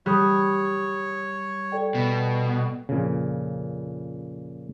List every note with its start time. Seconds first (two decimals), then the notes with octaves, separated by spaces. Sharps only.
0.06 G3 C#5 D#6 F#6
1.72 A4 D5 G5
1.95 B2
2.89 F2 A#2 C#3